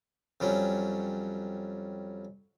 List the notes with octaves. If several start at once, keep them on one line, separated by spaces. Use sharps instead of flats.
F2 F#3 G3 C#4